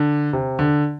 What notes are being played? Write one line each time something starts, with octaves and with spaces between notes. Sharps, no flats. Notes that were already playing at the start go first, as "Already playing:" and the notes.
Already playing: D3
C3
D3